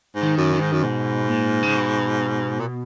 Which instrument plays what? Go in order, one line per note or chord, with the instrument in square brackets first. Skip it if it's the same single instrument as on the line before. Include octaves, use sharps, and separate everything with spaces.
[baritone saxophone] G#2
[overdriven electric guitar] D#3
[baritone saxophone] F#2
[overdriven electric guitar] D#3
[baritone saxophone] G#2
F#2
[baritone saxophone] G#2 [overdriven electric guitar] B2
[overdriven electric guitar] A#2
C#3
B2
[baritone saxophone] A#2